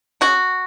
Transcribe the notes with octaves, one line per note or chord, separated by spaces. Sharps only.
C#3 F#4